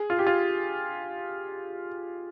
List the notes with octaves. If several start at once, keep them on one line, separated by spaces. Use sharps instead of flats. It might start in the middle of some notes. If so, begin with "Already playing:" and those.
Already playing: G#4
F4
G4
F4